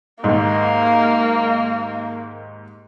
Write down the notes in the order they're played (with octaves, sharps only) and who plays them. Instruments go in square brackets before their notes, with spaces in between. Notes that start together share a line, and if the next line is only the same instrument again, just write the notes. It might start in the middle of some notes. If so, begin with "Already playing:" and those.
[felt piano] D#2 G#2 [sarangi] A#3